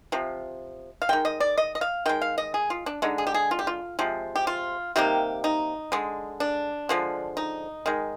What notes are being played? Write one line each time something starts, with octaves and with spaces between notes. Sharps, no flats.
C3 F3
F5
D#3 G#3 G5
D#5
D5
D#5
D#5
F5
D#3 G#3 G5
F5
D#5
G#4
F4
D4
D3 G#3 D#4
G#4
G4
G#4
F4
G4
F4
C3 F3 G#3
G4
F4
C3 D#3 G3 A#3 G4
D#4
D3 G#3
D4
D3 F3 G#3
D#4
D#3 G#3